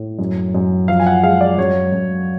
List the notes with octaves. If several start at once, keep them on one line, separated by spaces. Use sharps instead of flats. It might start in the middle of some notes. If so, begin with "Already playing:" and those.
Already playing: A2
F#2
F#2
F3 F5
G#5
F#5
G#3 F5
D5
F#2 C#5
F#2